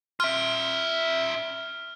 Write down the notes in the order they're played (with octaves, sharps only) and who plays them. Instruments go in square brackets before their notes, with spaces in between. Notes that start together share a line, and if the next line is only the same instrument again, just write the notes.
[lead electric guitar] F4 E5 [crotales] F6